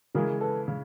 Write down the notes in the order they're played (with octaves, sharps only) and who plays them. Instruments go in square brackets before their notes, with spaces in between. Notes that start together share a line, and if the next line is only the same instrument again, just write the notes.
[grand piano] C#3 E3 G#3 [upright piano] G#4 A#4
[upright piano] A4 B4
[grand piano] C#3